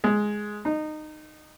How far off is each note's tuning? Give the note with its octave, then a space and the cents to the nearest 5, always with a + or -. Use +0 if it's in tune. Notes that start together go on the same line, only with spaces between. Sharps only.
G#3 +5
D#4 -20